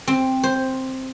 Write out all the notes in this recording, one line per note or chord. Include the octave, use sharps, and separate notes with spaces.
C4
C5